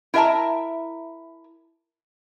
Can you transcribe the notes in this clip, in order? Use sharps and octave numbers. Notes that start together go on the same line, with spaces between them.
E4 A#4 E5 A5 A#5